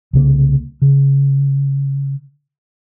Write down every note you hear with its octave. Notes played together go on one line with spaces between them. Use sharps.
C2 C#3 A#3
C#3